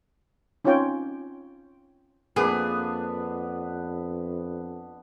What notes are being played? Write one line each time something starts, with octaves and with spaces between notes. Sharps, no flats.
C4 C#4 D#4 F4 C#5 G5
F2 A#3 B3 D4 G#4 B4